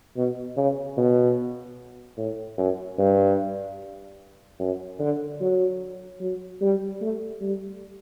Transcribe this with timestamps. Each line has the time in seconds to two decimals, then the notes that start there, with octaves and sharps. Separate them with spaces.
0.16 B2
0.57 C#3
0.97 B2
2.17 A2
2.58 F#2
2.99 G2
4.59 F#2
5.00 D3
5.41 F#3
6.21 F#3
6.61 G3
7.02 A3
7.41 G3